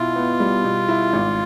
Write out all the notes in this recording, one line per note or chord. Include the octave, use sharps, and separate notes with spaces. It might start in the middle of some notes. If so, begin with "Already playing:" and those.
Already playing: B2 E4 F4
B3
G3
B2
E4
G#1